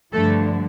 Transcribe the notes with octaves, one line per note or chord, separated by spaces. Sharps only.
G2 D3 F3 A3 A4